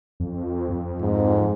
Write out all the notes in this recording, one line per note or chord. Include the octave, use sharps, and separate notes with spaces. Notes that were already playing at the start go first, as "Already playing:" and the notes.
F2
F2
G#2